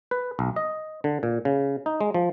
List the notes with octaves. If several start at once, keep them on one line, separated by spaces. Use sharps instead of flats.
B4
B1
D#5
D3
A#2
C#3
D#4
G#3
F3